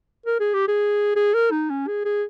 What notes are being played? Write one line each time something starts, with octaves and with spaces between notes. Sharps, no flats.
A#4
G#4
G4
G#4
G#4
A#4
D#4
C#4
G#4
G#4